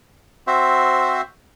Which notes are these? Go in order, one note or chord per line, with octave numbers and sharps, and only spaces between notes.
C4 F#4 C5 E5